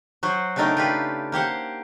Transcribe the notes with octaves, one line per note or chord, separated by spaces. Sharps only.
F#3 F#4 C5
C#3 A3 D4 D#4 A#4 G5
F4 G4 B4
A#3 G4 C5 F#5